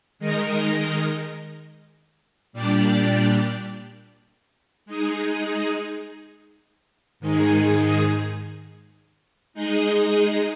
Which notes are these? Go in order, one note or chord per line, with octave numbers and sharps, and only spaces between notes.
D#3 G#3 D#4 A#4 D#5
A#2 G3 D4 G4 D5
G#3 D#4 G#4
G#2 D#3 G#3 D#4 G#4
G#3 D#4 G#4 D#5